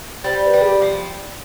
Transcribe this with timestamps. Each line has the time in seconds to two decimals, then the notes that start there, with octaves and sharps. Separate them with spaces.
0.24 G3 C5
0.47 B4
0.54 G3
0.62 G#4
0.68 G4
0.82 F3